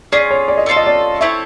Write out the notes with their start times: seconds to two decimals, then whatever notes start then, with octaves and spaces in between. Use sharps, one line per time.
0.12 C#4 F4 G#4 D5
0.31 C#5
0.48 D5
0.57 D#5
0.66 A3 D4 F4 A4 D5
0.76 D#5
0.86 D5
1.21 C4 E4 A4 C#5 E5